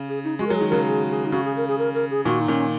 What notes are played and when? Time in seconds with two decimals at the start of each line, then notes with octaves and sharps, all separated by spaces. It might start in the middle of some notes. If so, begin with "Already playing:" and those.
Already playing: C#3
0.08 G#4
0.24 D#4
0.39 G#3 F#4
0.47 A#4
0.50 F#3 G#4
0.61 D#3
0.70 C#3 F#3 A#4
0.86 G#4
1.09 G#4
1.26 D#4
1.32 C#3 F#4
1.44 G#4
1.56 A#4
1.67 G#4
1.78 A#4
1.94 A#4
2.10 G#4
2.25 A#2 D#3 F#4
2.41 D#4
2.48 A#2 D#3 C#4